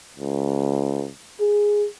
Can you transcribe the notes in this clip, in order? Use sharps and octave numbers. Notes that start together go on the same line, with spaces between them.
C#2
G#4